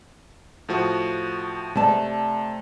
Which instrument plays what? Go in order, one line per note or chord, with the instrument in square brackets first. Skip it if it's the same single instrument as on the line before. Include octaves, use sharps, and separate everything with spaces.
[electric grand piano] A2 F3 F#4
[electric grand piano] C3 [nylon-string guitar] A3 D5 A5